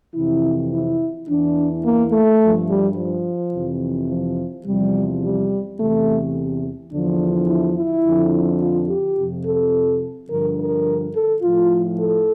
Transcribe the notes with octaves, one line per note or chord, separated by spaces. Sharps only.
F2 C3 E3 E4
E4
E2 E3 D4
A#3
A3
G2 F3
G3
F3
F2 C3 E3
F3
E2 C3 F3 G3
G3
E2 C3 E3 A3
E2 D3 F3 D4
E4
E4
F2 D3 F3
F4
G4
F2 C3 F3
A4
G2 D3 F3 A#4
A#4
A4
A2 F3 F4
A4